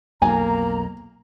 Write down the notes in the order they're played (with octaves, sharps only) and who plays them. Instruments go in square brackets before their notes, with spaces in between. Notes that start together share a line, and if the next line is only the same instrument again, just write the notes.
[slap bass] B1 F2 [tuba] A#3 [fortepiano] G#5 [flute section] A#5